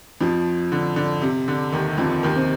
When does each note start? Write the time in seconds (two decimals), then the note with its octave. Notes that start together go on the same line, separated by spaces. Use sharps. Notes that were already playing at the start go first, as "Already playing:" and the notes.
0.21 F2 F3
0.72 D3
0.96 D3
1.22 C3
1.48 D3
1.72 D#2 D#3
1.97 F2 F3
2.23 D#2 D#3
2.36 C3 C4